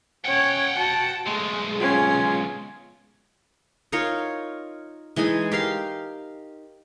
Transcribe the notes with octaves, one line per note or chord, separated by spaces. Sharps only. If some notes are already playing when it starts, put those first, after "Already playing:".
C#4 C#5 F#5 G5
F#4 A5
B1 G#3 A3
C#4 F4
D#4 F4 A#4 C#5
E3 G#3 D#4 G#5
G4 A#4 F5 C6